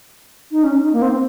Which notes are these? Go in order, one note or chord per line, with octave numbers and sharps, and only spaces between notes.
D#4
C#4
D#4
A#3
C4